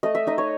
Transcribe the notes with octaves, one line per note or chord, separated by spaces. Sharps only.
A3 D#5
E5
D#4 D#5
C#5